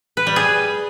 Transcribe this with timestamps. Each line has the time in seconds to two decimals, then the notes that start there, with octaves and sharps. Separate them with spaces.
0.17 B4
0.27 G3
0.36 G#4